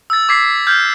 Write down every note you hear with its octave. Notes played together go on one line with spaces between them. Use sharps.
E6 A6
D6 G#6 B6 C7
F6 G6 G#6